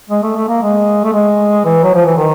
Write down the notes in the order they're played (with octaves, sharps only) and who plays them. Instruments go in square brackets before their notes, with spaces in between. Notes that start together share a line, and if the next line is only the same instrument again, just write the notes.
[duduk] G#3
A3
A3
A#3
G#3
A3
G#3
E3
F#3
F3
E3
D#3